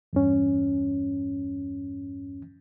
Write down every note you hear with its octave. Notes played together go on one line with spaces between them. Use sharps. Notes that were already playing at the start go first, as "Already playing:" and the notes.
E2 G2 C#4